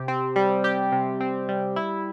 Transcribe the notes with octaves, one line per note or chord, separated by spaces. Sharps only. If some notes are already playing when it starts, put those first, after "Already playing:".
Already playing: C3 G4
C4
G3
G4
C3
C4
G3
E4